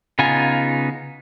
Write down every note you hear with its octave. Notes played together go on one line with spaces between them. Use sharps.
C#3 B3 D#4 F4 G#5